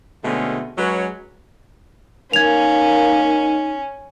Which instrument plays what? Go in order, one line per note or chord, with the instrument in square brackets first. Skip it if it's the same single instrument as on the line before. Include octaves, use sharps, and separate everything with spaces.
[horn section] B2 D3 G#3 A3 C4 C#4
F#3 G#3 C#4 B4 C#5
[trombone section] A#3 [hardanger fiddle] C#4 [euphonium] D#4 [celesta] G#6 F7